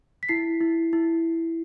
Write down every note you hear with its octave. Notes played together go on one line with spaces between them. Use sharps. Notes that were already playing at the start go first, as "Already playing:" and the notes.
B6
E4 C7
E4
E4